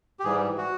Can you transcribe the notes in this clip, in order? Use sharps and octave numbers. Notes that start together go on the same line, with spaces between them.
G4
G#2 E3 G3 G#4
F#4